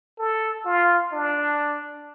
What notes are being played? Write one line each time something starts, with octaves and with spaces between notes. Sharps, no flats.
A4
F4
D4